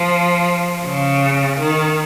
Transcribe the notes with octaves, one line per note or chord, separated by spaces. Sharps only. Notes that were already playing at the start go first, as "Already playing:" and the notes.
Already playing: F3
C#3
D#3